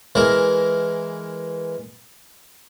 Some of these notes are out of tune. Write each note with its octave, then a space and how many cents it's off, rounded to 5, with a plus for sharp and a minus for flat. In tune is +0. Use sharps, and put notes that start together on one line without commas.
E3 +0 G#3 +0 A#4 +0